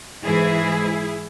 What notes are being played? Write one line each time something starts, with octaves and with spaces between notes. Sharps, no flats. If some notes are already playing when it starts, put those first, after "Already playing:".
G#2 E3 G#3 E4 G#4